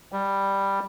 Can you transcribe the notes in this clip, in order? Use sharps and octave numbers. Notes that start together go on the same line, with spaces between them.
G3